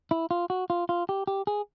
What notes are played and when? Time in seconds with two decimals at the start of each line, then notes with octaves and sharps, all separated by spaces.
0.11 E4
0.31 F4
0.50 F#4
0.70 F4
0.89 F4
1.09 G4
1.27 G4
1.47 G#4